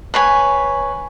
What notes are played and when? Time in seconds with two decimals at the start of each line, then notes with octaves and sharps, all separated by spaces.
0.14 B4 C#5 G#5